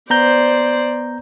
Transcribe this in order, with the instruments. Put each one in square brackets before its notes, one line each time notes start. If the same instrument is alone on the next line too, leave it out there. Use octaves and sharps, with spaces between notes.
[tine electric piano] B3 A#5 G6 [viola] C5 D5